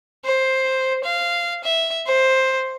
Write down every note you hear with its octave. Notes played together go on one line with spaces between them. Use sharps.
C5
F5
E5
C5